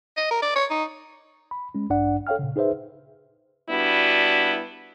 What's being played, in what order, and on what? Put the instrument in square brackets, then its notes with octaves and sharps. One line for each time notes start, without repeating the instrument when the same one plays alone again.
[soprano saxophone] D#5
A#4
D5
C#5
D#4
[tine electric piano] B5
G#3 C#4
A1 G2 D4 D5 F#5
A4 C#5 F5 G5 F6
A#2 C#3
D#4 G#4 B4 C5 E5
[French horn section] G3 B3 D4 E4 F#4